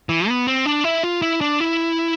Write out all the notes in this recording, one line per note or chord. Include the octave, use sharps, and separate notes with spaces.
E3
B3
C4
D4
E4
F4
E4
D4
E4